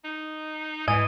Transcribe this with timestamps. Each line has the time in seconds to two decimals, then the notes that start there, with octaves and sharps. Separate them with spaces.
0.04 D#4
0.88 G#2 E3 D#5 G#5 D#7